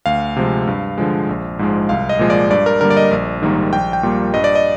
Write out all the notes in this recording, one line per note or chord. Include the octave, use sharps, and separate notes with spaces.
D2 F5
C3 F3 G#3
G2
D3 F3 G#3
A#1
G#2 F3 G#3
C2 F5
D#5
A#2 F3 G#3
D5
G2 D5
A#4
D3 G3 A#3 A#4
D5
D#5
A#1
G#2 D#3 G3 A#3
A#1 G5
G5
A#2 G3 A#3
G2 D#5
D5
D#5